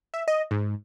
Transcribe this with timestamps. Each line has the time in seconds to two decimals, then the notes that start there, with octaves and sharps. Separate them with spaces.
0.14 E5
0.28 D#5
0.51 G#2